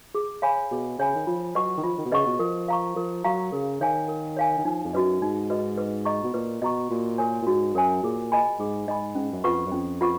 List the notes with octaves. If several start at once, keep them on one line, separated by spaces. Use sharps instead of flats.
G#4
C#5 F5 G#5 B5
B2 G#4
C#3 C#5 F5 G#5 B5
D#3
F3 F4
F#3 B4 D#5 F#5 C#6
D#3
F3 F4
D#3
B2
C#3 B4 D#5 F#5 C#6
B2
F3 A#4
F5 A#5 C#6
F3 A#4
F#3 F5 A#5 C#6
C#3 A#4
D#3 C#5 F5 G#5
A#4
C#5 F5 G#5
D#3
F3 D#4
F2
F#2 F#4 B4 D#5
G#2 D#4
F#4 B4 D#5
B4
D#5 A#5 C#6
B2
A#2 B4
B2 D#5 A#5 C#6
A#2 F#4
A#4 C#5 G#5
A#2
G#2 F#4
F#2 A#4 C#5 G#5
A#2 G#4
D#5 G#5 B5
G#2 G#4
G#2 D#5 G#5 B5
G#2 C#4
F#2
F2 F4 B4 F#5 C#6
F#2
F2 C#4
F4 B4 F#5 C#6